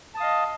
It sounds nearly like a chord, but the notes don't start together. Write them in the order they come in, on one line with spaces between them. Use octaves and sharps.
A5 D#6 F5 D#5